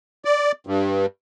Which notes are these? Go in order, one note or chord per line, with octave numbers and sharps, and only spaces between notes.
D5
G2